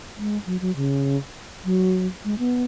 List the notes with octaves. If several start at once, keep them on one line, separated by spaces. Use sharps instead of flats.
G#3
F#3
F#3
C#3
F#3
G#3
B3